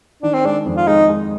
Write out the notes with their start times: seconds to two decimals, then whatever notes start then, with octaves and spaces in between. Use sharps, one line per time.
0.23 D#3 D4
0.34 C4
0.45 G#3 D4
0.66 F2
0.77 F4
0.87 G#3 D#4
1.10 G#3